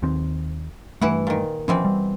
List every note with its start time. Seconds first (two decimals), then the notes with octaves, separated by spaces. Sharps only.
0.02 D#2 D#3 C4
1.01 G2 E3 A3 E4 F#5
1.27 A#2 D#3
1.68 B2 E3 F3 C4 C#4
1.85 G3